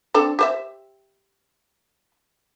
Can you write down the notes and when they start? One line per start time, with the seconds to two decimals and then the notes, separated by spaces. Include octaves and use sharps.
0.14 C4 D4 A4
0.39 G4 C5 E5